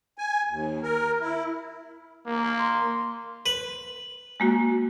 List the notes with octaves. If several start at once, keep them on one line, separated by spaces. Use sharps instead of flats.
G#5
D#2
A#4
E4
A#3
C6
B4
G#3 A#3 F#4